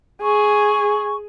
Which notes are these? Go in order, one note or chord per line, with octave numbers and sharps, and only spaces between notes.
G#4 C#6